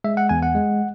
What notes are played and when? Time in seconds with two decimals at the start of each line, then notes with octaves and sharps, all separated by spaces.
0.04 G#3 E5
0.17 F#5
0.29 E2 G#5
0.43 F#5
0.55 G#3